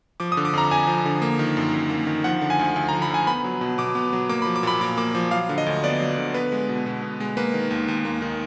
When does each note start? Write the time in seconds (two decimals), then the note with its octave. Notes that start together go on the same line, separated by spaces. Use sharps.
0.20 F3 D6
0.32 D#6
0.37 D3
0.45 D6
0.53 F2 A#5
0.71 F2 G#5
0.87 F3
1.06 D3
1.22 A#3
1.39 D#3
1.57 F#2
1.74 F#2
1.90 A#3
2.07 D#3
2.24 F3 F#5
2.41 D3
2.50 G#5
2.59 D2
2.76 D2
2.89 F3 A#5
3.02 B5
3.10 D3 G#5
3.27 B3 B5
3.44 F#3
3.61 B2
3.78 B2 D6
3.95 B3
4.13 F#3
4.29 A#3 D6
4.42 F3 B5
4.56 D6
4.63 A#2 B5
4.81 A#2 D6
4.97 A#3 D6
5.15 F3
5.31 F#3 F5
5.49 D3
5.58 D#5
5.66 D2
5.83 B3 D5
6.00 F#3
6.18 D3
6.34 B3 B4
6.52 G#3
6.69 B2
6.86 B2
7.02 B3
7.20 G#3
7.37 A#3 B4
7.54 D#3
7.71 D#2
7.88 D#2
8.05 A#3
8.22 D#3